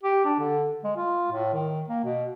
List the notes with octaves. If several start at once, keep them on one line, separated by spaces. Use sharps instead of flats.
G4
D4
D3
G#3
F4
A2
D#3
A#3
B2